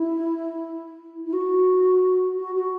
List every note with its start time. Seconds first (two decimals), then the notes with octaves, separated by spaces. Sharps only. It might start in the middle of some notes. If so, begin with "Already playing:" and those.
Already playing: E4
1.25 E4
1.33 F#4
2.37 F#4
2.55 F#4